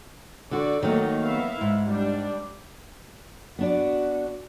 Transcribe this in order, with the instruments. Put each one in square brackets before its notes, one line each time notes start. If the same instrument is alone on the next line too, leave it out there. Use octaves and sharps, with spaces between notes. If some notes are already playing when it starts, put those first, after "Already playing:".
[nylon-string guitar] D3 F#4 [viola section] D5
[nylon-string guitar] D#3 F#3 A3 [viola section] A#3 D#4
[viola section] B3 E5 F5
[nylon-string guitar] G#2 [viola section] E4
[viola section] G3 D4
[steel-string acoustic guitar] B3 D4 D5 [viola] F#4